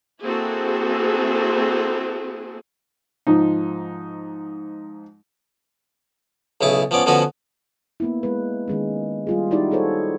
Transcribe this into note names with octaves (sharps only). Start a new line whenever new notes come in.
A#3 C4 E4 F#4 G#4 A4
G#2 F3 D#4
B1 C#3 E4 A5
F3 B3 C#4 D5
D3 F3 B3 C#4 F#4 B4
A#3 B3 E4
G#3 B4
D#3 G#3 C#4
G3 F4 G#4
D#4 E4 F#4 G4 D5
F#4 G#4 A4 C5 C#5